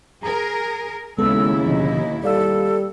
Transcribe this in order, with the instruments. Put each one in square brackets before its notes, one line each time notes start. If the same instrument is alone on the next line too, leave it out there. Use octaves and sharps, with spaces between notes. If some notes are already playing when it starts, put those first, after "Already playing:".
[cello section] G#4 A#4 [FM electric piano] A#5
[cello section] D#2 E4 [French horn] C#3 [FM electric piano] G#3 B3 A4 [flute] E6
[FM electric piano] B2 D3 F3 [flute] D#5
[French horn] G3 [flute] A4 [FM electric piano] D5 F5 E6